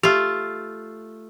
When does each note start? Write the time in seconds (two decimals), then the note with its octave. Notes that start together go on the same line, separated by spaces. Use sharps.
0.03 A3 F4 G4